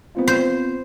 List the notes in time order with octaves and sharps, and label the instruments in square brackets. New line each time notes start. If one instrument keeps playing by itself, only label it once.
[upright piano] B3 C4 F4
[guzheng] C5